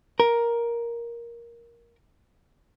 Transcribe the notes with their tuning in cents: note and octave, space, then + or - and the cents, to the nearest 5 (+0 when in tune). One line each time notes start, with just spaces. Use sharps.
A#4 +10